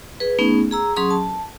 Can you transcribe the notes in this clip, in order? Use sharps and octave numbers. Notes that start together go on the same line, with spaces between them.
G#4 B4
A3 B3 C#4 D#4 G#4
G#4 A#5 E6
F#3 C#4 G#4 C6 D#6
A5